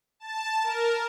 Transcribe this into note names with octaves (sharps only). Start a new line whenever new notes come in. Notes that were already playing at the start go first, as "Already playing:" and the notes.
A5
A#4